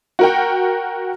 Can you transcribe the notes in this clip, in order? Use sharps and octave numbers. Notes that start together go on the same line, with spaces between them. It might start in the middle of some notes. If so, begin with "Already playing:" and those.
F#4 A#4 G5